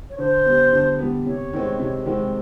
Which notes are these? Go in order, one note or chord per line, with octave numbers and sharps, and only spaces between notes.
C#5
D3 C5
G3 B3
D3
G3 B3
C3 C#5
D#3 G#3 C4
C3
D#3 G#3 C4